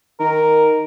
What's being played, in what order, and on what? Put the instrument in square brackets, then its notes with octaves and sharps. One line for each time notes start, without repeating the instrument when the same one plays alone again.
[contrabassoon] D#3 [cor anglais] A#4